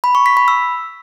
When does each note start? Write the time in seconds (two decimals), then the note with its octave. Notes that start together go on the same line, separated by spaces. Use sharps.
0.04 B5
0.15 C#6
0.26 B6
0.37 B5
0.48 E6